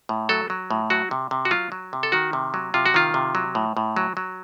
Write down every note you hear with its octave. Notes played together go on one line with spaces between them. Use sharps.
A2
F#3 A4
F#3
A2
F#3 F#4
C3
C3
F#4
F#3 F4
F#3
C3
A4
D#3 F#4
C3
F#3
C3 F4
F#4
D#3 F4
C3
F#3
A2
A2
F#3
F#3